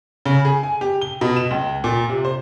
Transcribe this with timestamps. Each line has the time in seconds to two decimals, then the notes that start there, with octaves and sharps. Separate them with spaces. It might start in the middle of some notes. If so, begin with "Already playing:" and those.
0.26 C#3
0.45 G#4
0.63 G#5
0.81 G4
1.01 G7
1.21 B2
1.36 E7
1.51 C#2
1.84 A#2
2.09 C3
2.25 C5